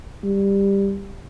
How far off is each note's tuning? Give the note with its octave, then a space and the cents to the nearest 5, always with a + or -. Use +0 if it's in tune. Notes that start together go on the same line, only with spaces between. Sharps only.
G3 +10